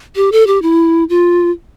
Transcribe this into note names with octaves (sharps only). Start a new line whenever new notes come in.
G4
A4
G4
E4
F4